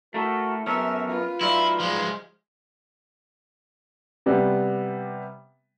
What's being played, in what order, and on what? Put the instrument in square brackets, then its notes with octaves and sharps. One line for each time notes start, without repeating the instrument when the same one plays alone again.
[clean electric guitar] A3 E4 A4 [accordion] F#4 A#4
[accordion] F#2 A#4 F6 [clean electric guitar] B3 A4 C#5 [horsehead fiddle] E5
[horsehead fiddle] F4 B4
[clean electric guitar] F#3 D#4 D5 [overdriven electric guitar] E4 [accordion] F5 B5 C6
[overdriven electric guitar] F3 G#3
[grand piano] C3 G3 B3